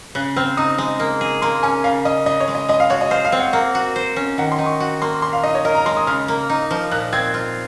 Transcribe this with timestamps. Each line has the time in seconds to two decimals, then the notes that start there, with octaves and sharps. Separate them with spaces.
0.15 C#3 F#6
0.36 C4 F6
0.57 D#4 D#6
0.78 G#3
0.99 A#3
1.21 G#4
1.42 A#3 C6
1.63 C#4 G#5
1.84 C#3 F5
2.05 C#4 D#5
2.26 C#3 D#5
2.40 C#5
2.48 G#3
2.55 D#5
2.69 G#3 D#5
2.80 F5
2.90 F#4 C#5
3.01 D#5
3.11 C5 F5
3.25 F5
3.32 C4
3.40 F#5
3.53 A#3 F#5
3.75 F#4
3.96 C5
4.16 C#4
4.38 D#3 F#5
4.52 C6
4.59 D#4
4.66 C#6
4.80 F#4
5.02 A#3 C6
5.22 A#2 C6
5.33 F5
5.43 D#4 D#5
5.55 C#5
5.65 A#4 D#5
5.75 A#5
5.86 G#3 C6
5.97 D#6
6.07 C#3 F6
6.28 A#3
6.50 D#4
6.71 F3
6.91 A#2 F#6
7.13 C4 G#6
7.34 F4